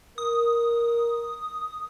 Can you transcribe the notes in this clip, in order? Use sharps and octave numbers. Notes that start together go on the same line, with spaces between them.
A#4 D#6